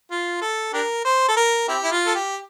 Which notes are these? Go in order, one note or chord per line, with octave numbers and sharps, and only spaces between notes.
F4
A4
D4 G4 A#4
C5
A4
A#4
C4 E4 G4
E4
F4
A4
G4